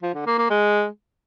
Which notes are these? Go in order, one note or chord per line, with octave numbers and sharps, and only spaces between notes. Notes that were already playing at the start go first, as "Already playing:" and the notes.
F3
D3
A#3
A#3
G#3